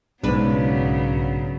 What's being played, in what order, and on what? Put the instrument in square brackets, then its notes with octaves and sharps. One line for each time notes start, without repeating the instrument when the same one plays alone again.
[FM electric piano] B1 G#2 [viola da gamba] C#3 F#3 B3 [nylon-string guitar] D4 B4